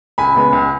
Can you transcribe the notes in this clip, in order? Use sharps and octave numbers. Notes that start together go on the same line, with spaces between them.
C#2 G#5 B5
C#3 G#3 B3
C#2